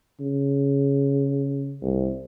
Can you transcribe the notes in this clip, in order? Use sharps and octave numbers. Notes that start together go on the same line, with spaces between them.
C#3
C2